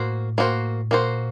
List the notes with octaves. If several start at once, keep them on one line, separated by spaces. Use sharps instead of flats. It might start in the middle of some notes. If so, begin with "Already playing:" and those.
Already playing: A2 A#3 F#4 C5
A#3 F#4 C5
A#2 A#3 F#4 C5